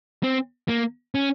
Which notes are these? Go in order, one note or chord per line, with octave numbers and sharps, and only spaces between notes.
C4
A#3
C#4